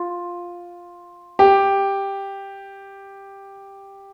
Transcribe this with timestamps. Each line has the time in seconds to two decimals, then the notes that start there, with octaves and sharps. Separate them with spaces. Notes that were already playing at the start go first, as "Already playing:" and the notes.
Already playing: F4
1.39 G4